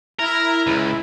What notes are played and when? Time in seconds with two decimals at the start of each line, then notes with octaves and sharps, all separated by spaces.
0.19 E4 A#4 A#5
0.67 C#2 E4